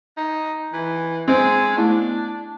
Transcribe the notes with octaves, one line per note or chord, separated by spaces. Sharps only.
D#4
E3
G#3 C4
A3 B3 D4 E4